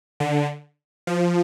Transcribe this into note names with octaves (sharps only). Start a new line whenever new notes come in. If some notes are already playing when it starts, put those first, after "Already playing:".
D3
F3